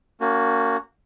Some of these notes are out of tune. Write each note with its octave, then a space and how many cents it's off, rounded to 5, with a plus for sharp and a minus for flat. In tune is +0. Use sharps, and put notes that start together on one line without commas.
A#3 -20 C#4 +25 F#4 +0